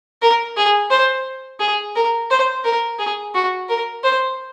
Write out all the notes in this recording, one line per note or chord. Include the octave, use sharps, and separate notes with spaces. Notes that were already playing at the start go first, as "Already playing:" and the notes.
A#4
G#4
C5
G#4
A#4
C5
A#4
G#4
F#4
A#4
C5